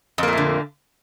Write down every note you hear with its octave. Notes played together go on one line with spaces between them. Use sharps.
F2 A#2 D3 A3 A#3